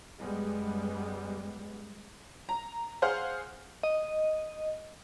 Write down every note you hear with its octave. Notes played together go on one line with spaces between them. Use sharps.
F#2 G3 G#3 B3
A#5
G#4 C5 F5 F#5 F6
D#5